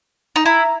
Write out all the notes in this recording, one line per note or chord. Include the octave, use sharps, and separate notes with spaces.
D#4
E4 A#5